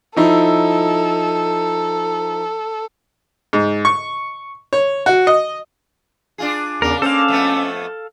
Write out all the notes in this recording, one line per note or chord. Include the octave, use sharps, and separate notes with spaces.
F3 D#4 E4 A4
G#2
C#6
C#5
F#4
D#5
D4 F4 G#4
E2 C#3 D4 A#4
A#3 C#4 A4 C5 F5
F2 A3 B3